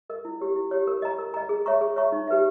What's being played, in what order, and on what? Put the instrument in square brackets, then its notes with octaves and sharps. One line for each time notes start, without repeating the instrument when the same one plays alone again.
[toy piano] A#4 D#5
E4
G4 C#5
E4
G4 C#5
A#4
D#5 A#5
A#4
D#5 A#5
G#4
C#5 E5 A#5 C#6
G#4
C#5 E5 A#5 C#6
D#4
G4 B4 E5